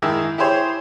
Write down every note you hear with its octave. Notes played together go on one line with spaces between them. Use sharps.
G#2 D#3 E4 G#4 E6
E4 G4 G#4 C5 C#5